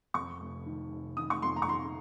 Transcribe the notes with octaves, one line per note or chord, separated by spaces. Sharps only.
F2 C#6
F1
D#3
F1
D#3 D#6
C#6
F2 C6
A#5
C#6
D#3 C6